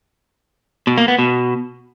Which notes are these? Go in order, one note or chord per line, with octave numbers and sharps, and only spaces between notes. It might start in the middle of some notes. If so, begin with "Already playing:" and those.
B2
A#3
B3
B2